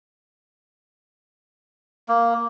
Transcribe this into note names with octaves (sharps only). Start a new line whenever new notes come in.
A#3